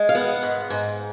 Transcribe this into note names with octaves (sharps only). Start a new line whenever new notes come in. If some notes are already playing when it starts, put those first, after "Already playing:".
Already playing: G#3
F5
B3 F#5
G#2
G#2